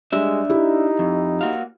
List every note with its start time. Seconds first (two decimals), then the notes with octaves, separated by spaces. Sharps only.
0.12 G3 G#3 D4 E5
0.50 D#4 E4 G4
0.99 F2
1.41 A#3 F#4 F5